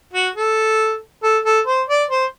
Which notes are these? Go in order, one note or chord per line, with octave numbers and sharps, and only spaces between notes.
F#4
A4
A4
A4
C5
D5
C5